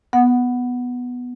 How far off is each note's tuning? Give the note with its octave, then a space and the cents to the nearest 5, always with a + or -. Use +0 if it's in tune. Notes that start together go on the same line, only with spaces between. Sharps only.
B3 +0 F#5 +0